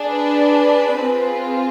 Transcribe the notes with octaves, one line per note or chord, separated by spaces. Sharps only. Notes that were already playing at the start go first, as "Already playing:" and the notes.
Already playing: D4 G#4
B4
C4 F4 G#4